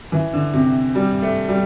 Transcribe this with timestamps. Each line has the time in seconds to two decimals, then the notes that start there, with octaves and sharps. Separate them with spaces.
0.12 E3
0.33 D3
0.53 C3
0.95 G3
1.22 A3
1.49 G3